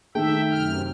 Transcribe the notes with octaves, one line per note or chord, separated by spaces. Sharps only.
D#3 A3 E5 G5
F#2 C3 F6